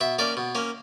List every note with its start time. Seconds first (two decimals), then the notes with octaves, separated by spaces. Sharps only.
0.01 B2 E5
0.19 A#3 C#4 D5
0.37 B2
0.55 A#3 C#4